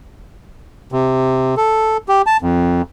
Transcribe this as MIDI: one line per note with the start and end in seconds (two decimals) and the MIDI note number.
0.92 1.55 48
1.57 1.97 69
2.08 2.22 67
2.26 2.37 81
2.42 2.82 41